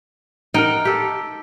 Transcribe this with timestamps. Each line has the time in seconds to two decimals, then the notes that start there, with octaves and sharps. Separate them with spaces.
0.54 D#4 A#4 F#5 G5
0.85 G4 A4